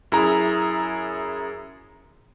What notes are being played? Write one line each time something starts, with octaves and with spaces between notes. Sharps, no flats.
F#2 E4 G#4 A#5